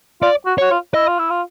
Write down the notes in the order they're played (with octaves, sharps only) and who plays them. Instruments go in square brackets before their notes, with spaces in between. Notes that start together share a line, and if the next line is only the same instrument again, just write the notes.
[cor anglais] F4 [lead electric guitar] D5
[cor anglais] F#4
[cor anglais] F#4 [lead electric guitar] C#5
[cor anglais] F4
[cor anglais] E4 [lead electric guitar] D#5
[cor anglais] F4
E4
F4